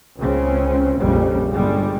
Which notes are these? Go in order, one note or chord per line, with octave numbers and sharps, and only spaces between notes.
C#2 C#3 C4 C#4
A#1 F2 C#3 G3
G1 G3 G#3